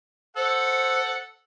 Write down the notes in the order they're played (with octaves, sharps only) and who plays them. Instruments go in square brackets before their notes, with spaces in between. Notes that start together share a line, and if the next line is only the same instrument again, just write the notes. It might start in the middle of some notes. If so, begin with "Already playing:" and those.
[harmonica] A4 F#5 [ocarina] C5